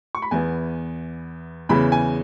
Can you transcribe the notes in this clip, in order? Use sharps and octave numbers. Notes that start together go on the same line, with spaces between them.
C#6
B5
E2 E3 B3 G#5
E2 C#3 E3 B5
G#5